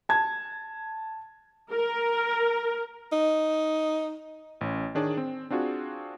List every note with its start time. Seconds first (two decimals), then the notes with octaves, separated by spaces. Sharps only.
0.09 A5 G#6
1.73 A#4
3.12 D#4
4.61 A1 C#4
4.95 D#3 D4 G#4 C#5 D5
5.17 C4
5.50 C4 D4 F4 F#4 G#4